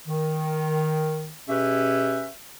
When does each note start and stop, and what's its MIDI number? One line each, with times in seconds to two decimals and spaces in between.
0.07 1.32 51
1.49 2.26 47
1.49 2.26 61
1.49 2.26 67
1.49 2.26 68
1.49 2.26 71
1.49 2.26 76